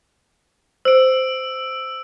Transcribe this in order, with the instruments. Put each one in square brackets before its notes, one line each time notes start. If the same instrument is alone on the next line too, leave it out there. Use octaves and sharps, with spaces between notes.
[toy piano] C5 [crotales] E6 D7